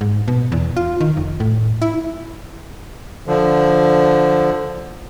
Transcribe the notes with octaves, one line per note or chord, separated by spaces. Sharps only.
G#2
B2
E2
F4
D#3
F1
A2
E4
D3 F3